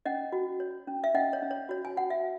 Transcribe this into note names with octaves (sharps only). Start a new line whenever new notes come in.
C#4 D#5 F#5
F#4
C#5
C#4
E5
C#4 D#5 F#5
C#5
C#4
C#5
F#4 C#5
G#5
F#4 F#5
E5